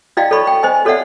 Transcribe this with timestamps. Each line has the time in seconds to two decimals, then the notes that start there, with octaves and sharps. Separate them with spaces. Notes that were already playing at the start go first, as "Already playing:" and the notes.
0.17 E4 F#4 D5 D#5 F5 G5
0.31 A4 C#5 D5 B5 C#6
0.47 G5
0.63 C5 D#5 G#5
0.85 F#4 A4 C#5 D5 E5 F#5